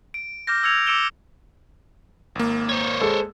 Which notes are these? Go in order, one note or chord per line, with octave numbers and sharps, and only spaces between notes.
D7
D6 F6 G6 A#6
E6 G#6 C#7 F7
D6 E6 C#7 D7 E7 G7
G#1 A#3
C5 C#5
G#3 A4